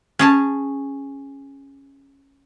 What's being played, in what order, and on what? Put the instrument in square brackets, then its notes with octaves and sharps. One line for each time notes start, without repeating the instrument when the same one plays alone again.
[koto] C#4 G#4 A5